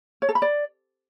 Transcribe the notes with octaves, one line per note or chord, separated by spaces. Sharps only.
C#5
A4
B5
D5